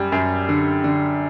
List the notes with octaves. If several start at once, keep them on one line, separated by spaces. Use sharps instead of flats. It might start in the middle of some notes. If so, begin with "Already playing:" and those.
Already playing: F#2 G3
F#2
D3
D3